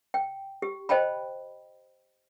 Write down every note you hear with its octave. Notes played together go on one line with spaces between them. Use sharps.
G5
G4
C5 D#5 G5 A5 B5